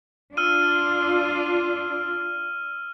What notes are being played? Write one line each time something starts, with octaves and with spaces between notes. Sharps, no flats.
D4 F4 E6 F6 D#7